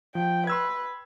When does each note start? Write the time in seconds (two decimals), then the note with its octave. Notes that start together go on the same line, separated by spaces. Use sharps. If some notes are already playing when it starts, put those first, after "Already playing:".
0.15 F3 G5
0.47 B4 C6 E6 G#6